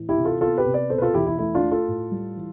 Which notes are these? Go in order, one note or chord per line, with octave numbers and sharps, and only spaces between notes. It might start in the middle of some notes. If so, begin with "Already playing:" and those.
Already playing: A2 E3
E4 G4
C3
F4 A4
B3 F4 A4
G4 B4
C3
B4 D5
B2 A4 C5
B4
F4 A4
E2 E4 G4
E4
A3 E4
D4 F4
A3
F4 A4
A2
G3
E3